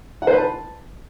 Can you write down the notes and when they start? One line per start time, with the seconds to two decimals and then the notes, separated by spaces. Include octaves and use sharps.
0.22 F#5
0.27 C5
0.33 B4
0.38 A5